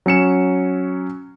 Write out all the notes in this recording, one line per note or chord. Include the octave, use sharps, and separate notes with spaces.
F#3 C#4 C#7 E7